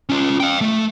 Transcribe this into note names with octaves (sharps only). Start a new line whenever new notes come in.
C#4 F4
F5 G5
A3